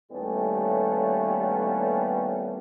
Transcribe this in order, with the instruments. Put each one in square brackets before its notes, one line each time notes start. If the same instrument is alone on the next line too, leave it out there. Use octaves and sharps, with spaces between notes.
[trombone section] D#2 A2 G3 A3 B3 C#4